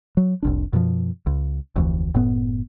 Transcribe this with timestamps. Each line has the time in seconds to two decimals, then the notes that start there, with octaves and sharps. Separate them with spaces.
0.17 F#3
0.43 F1 C2 D4
0.73 F#2 B2 D#3 F3
1.27 C#2
1.76 F1 D2 E3
2.14 F#1 A2 B3